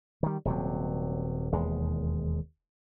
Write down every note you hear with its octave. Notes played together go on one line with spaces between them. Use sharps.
D#3 G3
D#1 C3 F#3
E1 D#2 G#3